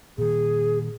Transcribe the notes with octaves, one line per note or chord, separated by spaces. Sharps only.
A#2 D#3 G#4